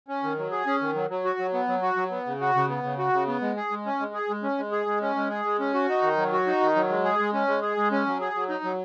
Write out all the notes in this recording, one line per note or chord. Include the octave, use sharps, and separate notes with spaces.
C#4
D#3
F#3
G#4
C#4
D#3
F#3
F#3
F#4
F#3
B3
F#3
F#4
F#3
B3
C#3
F#4
C#3
B3
C#3
F#4
C#3
B3
G#3
G#4
G#3
C#4
G#3
G#4
G#3
C#4
G#3
G#4
G#3
C#4
G#3
G#4
G#3
C#4
F#4
D#4
D#3
F#3
F#4
D#4
D#3
F#3
G#3
G#4
G#3
C#4
G#3
G#4
G#3
C#4
F#3
G#4
F#3
D#4
F#3